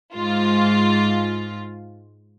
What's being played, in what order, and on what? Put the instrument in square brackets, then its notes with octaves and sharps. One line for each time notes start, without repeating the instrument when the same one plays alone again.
[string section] G#2 F4